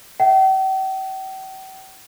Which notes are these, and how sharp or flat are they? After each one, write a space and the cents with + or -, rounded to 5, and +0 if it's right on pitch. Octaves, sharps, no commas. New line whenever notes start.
E5 +0 G5 -45